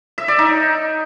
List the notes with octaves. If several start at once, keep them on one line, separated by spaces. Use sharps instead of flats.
E5
D5
D#4